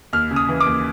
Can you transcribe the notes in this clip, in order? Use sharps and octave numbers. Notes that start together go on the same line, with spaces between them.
D#2 F6
C#3
D#6
E3
D6
D#2